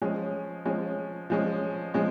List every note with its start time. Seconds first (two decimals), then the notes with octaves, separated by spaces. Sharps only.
0.02 F3 G#3 C#4
0.66 F3 G#3 C#4
1.30 F3 G#3 C#4
1.94 F3 G#3 C#4